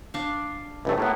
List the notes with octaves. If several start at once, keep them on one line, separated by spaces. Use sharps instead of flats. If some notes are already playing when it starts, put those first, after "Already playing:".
D4 F5
C#2 G2 A3
A2 A#3 B3